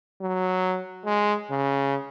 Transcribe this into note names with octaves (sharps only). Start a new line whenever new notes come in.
F#3
G#3
C#3